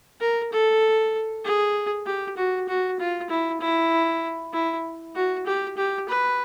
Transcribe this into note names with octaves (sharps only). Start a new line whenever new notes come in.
A#4
A4
G#4
G4
F#4
F#4
F4
E4
E4
E4
F#4
G4
G4
B4